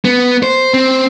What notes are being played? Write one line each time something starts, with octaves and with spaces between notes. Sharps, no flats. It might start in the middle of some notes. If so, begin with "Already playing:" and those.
B3
C5
C4